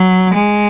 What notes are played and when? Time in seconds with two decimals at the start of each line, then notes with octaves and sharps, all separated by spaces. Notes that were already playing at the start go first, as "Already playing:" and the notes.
Already playing: F#3
0.34 G#3